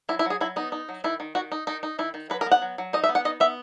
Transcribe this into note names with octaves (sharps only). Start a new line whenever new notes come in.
F#3 E4
E4
F#3 G#4
F#3 E4
B3 D#4
D#4
F#3
D#3 E4
D#3
D#3 F#4
D#4
D#3 D#4
D#4
D#3 E4
D#3
F#3 B4
A#4
B3
F#5
F#3
F#3
D#4 D#5
E5
B3
F#5
D#4 D#5
B3 E5